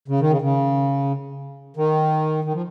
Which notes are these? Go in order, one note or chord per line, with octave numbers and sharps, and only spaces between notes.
C#3
D#3
C#3
C#3
D#3
D#3
F3